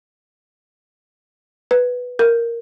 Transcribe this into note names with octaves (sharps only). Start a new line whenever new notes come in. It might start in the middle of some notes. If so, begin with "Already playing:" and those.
B4
A#4